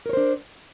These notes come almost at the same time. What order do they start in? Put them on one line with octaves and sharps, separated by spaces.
A#4 C#5 C5 D4